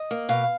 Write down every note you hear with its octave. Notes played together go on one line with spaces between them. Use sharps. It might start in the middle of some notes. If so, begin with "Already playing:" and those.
Already playing: D#5
A#3
B2 F5